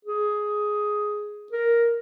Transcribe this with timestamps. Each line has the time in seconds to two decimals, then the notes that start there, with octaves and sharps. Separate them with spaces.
0.05 G#4
1.52 A#4